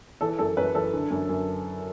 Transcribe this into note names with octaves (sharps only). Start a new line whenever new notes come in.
E3 A4
F#2 A4
F#2 B4
E3 A4
D3
F#2
F#2